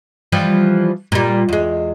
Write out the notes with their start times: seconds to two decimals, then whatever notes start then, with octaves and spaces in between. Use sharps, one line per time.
0.32 E3 F3 G3
1.12 A#2 G3
1.49 E2 G#3